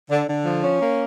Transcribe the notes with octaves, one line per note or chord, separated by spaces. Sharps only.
D3
D3
F3
C#4
A#3